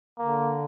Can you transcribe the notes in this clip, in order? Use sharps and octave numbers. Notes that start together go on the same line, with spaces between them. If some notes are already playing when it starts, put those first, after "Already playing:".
D3 A#3